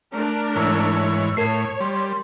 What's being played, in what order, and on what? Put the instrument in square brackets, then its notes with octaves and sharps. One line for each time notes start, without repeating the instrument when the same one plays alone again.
[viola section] A3 D4 A#4
[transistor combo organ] G#2 E3 C#5 [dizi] E6
[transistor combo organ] A2 [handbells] A#4 C7 [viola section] C#5 [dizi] A5
[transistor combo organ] G3 [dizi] C6